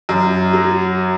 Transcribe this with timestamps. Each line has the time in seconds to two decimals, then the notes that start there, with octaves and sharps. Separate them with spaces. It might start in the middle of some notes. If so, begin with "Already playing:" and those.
0.09 F#2
0.53 F#3